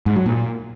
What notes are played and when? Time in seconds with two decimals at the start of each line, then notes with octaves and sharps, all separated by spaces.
0.06 G#2
0.16 F#3
0.26 A#2